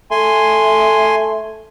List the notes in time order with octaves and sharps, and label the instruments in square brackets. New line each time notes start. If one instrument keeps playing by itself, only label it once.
[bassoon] A3 [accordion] G#5 C6